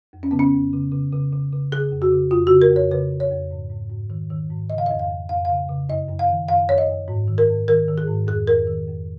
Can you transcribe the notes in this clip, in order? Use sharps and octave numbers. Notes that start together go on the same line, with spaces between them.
F2
C#4
C#3 B3
C#4
F2
C#3
C#3
C#3
C#3
C#3
C#3 G#4
F2
F#4
C#3
F2 F4
C#3 F#4
A#4
F2
C#5
C#3 B4
C#3
C#5
F2
G#2
G#2
G#2
D#3
D#3
G#2
C#3 D#5
F5
F2 D#5
F5
F2
F2 F5
C#3 F5
C#3
F#2 D#5
F#2
F5
D#3
F#2 F5
F#2 C#5
D#5
F#2
G#2
D#3
A#4
G#2
D#3 A#4
D#3
G#4
G#2
F2 G#4
F2 A#4
D#3
F2